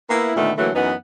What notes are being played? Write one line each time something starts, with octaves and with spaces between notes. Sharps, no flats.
A#3 B3 E4
A#2 D3 D#3 A3 B3
D3 E3 F#3 A3 A#3
F#2 E3 B3 D#4 F#5